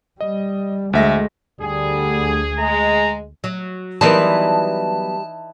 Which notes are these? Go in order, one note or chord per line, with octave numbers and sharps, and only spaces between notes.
G3 D#5
D2 G#3 A3 E5 A#6
D2 D3 G3 G#4
G#3 A#5
F#3
E3 F#3 G3 B3 D#4 A#4 C5 A5